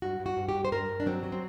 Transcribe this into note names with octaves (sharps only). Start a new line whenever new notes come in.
G2 F#4
G2
F#4
G2
G4
G2
C5
G2 A#4
G2
D4
F#3 C4
F#3
C4